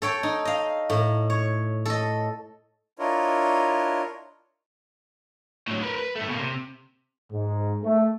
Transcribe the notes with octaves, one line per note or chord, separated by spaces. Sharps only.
A4 C#5 G5
D#4
D#5 F5
A2
C#5
A4 D#5
D4 E4 F4 A#4 C#5 D#5
A2 F#3
A#4 B4
B4
G2 A3
B2 A#3
C3
G#2
A3